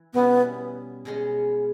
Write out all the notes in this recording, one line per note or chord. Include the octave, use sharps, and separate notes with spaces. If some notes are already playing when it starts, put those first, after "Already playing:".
Already playing: E3
B2 G3 B3 C#4 E4
B2 G#3 C#4